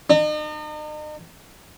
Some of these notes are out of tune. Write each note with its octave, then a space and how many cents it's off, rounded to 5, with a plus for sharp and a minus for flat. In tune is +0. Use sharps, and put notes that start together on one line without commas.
D#4 -40